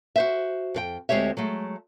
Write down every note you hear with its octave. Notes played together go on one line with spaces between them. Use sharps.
F#4 C5 E5
F2 B4 G5
D2 G#3 C4 G4 C#5 E5
F#3 G#3 A3